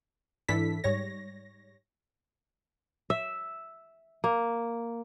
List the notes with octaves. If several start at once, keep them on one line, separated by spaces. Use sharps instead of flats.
G#2 E3 D4 E4 A4 B6
G#2 G3 C#5 A#6
E5
A#3